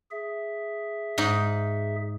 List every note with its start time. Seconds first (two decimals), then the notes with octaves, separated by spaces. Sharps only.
0.11 G#4 E5
1.18 G#2 D#4